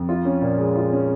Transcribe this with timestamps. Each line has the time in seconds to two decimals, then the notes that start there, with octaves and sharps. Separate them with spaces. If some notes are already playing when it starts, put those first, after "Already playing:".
Already playing: F2
0.09 F4
0.25 C#4
0.42 A#2
0.58 G#3
0.75 F4
0.92 C#4